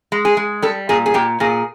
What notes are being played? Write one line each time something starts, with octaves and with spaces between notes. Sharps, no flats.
G#3
G#4
G#3
G3 A4
A#2 G#4
G#4
A#2 G4
A#2 G#4